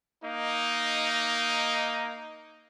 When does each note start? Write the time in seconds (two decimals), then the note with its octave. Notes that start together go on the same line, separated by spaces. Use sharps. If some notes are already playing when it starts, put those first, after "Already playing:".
0.24 A#3 D#4